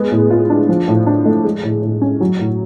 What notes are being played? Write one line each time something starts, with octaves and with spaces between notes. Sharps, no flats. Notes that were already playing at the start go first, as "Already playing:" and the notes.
Already playing: G#3 B3
A2
F4
D4
F3
A2
D4
A3
G#3
A2
A2
C#4
F#3
A2